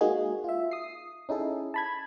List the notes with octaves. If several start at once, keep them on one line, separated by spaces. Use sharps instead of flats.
G#3 A#3 D#4 F#4 G#4
F4 E5
D#6 C7
C#4 D#4 E4 G#4 A4
A5 B5 G#6